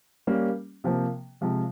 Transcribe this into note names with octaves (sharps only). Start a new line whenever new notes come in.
G3 A#3 C#4
C3 F3 A#3
C3 F3 G#3